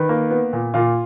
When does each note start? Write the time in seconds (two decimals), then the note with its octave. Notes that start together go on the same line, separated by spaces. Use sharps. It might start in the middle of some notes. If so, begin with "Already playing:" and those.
Already playing: D#3 B4
0.09 A#3
0.31 B3
0.53 A#2
0.74 A#2 F4